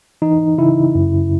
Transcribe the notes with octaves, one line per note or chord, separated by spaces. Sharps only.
E3 D#4
C#3 E4
F#2